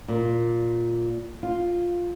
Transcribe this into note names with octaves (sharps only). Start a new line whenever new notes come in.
A#2
F4